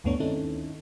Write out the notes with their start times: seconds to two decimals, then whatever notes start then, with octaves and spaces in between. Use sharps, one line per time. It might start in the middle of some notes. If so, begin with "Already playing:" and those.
0.04 D2 G2 A3 B3 D4 C#5
0.20 D#3 C4 C#4 D#4 E4 A4